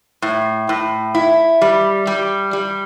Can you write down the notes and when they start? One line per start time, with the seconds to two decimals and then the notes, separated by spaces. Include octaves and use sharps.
0.22 A2
0.69 A2
1.15 E4
1.62 G3
2.07 G3
2.53 G3